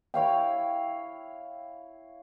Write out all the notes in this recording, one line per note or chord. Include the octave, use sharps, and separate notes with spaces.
E4 C#5 F5 G5